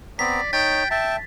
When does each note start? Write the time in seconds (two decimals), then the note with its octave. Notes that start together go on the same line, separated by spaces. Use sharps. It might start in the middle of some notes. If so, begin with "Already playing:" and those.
0.19 B3 C4 D5 A#5 B6
0.53 D#4 C#5 G5 A6
0.91 E5 G5 A5